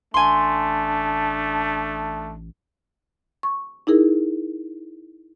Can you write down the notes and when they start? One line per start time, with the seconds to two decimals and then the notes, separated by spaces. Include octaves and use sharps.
0.14 A1 A3 D4 G#5 C6
3.43 C#6
3.87 D#4 E4 G#4 A#4